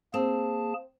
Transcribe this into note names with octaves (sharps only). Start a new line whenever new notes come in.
A#3 C4 G#4 A5